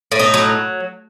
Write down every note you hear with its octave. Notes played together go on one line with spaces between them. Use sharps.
A2
D#4
F#3